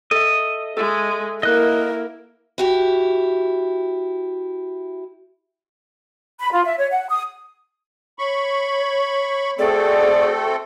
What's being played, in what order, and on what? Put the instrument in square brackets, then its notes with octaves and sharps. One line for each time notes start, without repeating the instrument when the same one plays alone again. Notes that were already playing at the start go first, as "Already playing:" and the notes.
[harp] A4 E5 [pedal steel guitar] D#5
[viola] G#3 [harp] A4 E5
[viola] A#3 [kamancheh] E4 A#4 [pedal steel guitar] D#5 F#6
[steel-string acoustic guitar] E4 F#4 G4
[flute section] B5
F4
E5
C#5
F#5
D#6
[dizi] C#5 [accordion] B5 C#6
[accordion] A3 C4 A4 [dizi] F#4 [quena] G#4 [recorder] D5